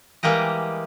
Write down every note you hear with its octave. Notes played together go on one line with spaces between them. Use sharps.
E3 G3 G#3 A#3 G4 D#5